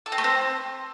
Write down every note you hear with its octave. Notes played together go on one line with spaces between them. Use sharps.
A4
C4
A3
C4